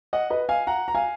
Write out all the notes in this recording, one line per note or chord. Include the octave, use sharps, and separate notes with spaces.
D#5 F#5
B4 D#5
F5 G#5
F#5 A#5
A#5
F5 G#5